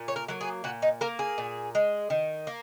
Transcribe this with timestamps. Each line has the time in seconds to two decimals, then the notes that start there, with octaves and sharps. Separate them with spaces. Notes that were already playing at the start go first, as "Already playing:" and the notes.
Already playing: A#2
0.08 C#5
0.16 A#4
0.28 F#3 A#3
0.41 G#4
0.64 A#2 F#4
0.82 D#4
1.01 A#3 A#4
1.19 G#4
1.38 A#2
1.75 G#3
2.10 D#3
2.47 A#3